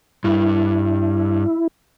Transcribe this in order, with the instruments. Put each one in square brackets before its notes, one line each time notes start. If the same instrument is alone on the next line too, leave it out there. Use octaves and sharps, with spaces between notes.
[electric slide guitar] G2 [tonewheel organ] E4